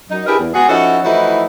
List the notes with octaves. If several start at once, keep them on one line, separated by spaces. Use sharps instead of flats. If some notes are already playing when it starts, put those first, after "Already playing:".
F#2 D#4
D4 E4 G4 G#4 A#4 B4
E2
G#3 B3 F#4 G#4
F3 C#4 D#4 E4 F#4 A4
E3 F3 A3 D#4 E4 F#4